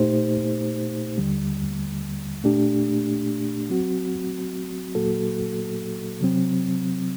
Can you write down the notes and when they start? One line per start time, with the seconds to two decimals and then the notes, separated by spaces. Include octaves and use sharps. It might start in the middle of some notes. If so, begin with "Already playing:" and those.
Already playing: A#2 A3 D#4 G4 C5
1.18 D#2 D3 G3
2.44 A#2 A3 D4 G4
3.69 F#3 C4 F#4
4.95 A#2 F#3 A#3 F#4 A4
6.21 C3 F#3 C4